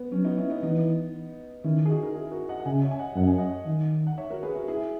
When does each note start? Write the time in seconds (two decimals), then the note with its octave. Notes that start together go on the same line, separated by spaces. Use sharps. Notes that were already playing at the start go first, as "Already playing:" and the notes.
Already playing: B3
0.12 F#3 C#4
0.24 B3 D#4
0.37 C#4 E4
0.50 B3 D#4
0.63 E3 B3 D#4
1.64 D#3 C#4 E4
1.85 G#4
1.89 D#4 F#4
2.03 A#4
2.14 E4 G#4
2.32 F#4 A#4
2.49 D#5 F#5
2.60 F#5
2.65 C#3 E5 G#5
2.82 C#5 E5
2.91 G#5
2.99 D#5 F#5
3.16 F#2 F#5
3.27 G#5
3.38 D#5 F#5
3.66 D#3
4.07 F#5
4.18 C#5 E5
4.30 F#4 A#4
4.43 G#4 B4
4.55 F#4 A#4
4.68 E4 G#4